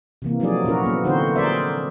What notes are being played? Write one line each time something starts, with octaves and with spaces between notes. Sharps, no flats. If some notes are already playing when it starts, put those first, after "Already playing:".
C3 E3 A#3
F3 F#3 A3 D#4 G#4 D5
A#2 C#4 E4 F#4 A#4
A#3 B3
D3 E3 C4 D#4 F#4 C5
G#4 A#4 C5 D5 E5